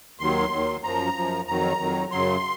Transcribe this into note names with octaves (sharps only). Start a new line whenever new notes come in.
D#2 D#3 F#3 C6
D#2 D#3 F#3
F#2 F3 A#5
F#2 F3
F2 D#3 F#3 A#5
F2 D#3 F#3
F#2 C#3 F#3 C6